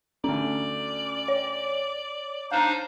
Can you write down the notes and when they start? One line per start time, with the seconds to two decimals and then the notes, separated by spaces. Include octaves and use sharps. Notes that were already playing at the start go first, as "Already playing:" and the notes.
0.24 D2 A3 C#4 D5
1.28 C#5
2.51 D4 D#4 C5 F5 A#5